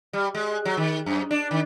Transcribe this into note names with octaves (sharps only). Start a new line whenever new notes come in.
G3
G#3
F#3
D#3
F#2
D4
D#3